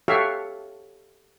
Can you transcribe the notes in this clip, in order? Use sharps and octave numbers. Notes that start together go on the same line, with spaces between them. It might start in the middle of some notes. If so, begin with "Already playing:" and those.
F#4 G4 A4 C#5 E5 F5